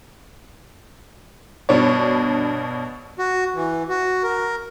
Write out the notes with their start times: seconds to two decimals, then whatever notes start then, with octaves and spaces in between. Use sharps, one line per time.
1.69 G2 B2 D4 C#5
3.19 F#4
3.55 E3
3.89 F#4
4.23 A#4